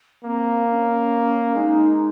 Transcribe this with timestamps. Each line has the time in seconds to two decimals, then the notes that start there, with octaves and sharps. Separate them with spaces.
0.24 A#3 C4
0.68 C#4
1.55 G#3 D#4